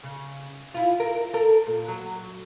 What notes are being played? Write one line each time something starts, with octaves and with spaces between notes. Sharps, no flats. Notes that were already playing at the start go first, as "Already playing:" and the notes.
C#3
E4 F4
A#4
A4 A#4
A#2
F#3